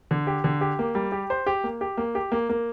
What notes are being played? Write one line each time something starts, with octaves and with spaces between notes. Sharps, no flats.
D3
G4
D3
G4
A#3
G3
G4
C5
G4
A#3
G4
A#3
G4
A#3
A#3